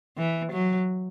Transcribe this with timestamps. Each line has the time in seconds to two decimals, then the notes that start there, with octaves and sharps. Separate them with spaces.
0.17 E3
0.52 F#3